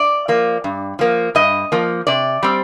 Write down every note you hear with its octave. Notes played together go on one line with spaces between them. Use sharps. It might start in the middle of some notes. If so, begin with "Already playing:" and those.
Already playing: D5
F3 A#3
G2
F3 A#3
G2 D#5
F3 A#3
C3 D5
G3 C4